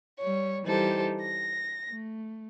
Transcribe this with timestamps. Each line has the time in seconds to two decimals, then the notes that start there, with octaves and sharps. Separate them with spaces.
0.18 G3 C#5
0.63 E3 G3 D#4 G4 A4 C5
1.21 A#6
1.89 A3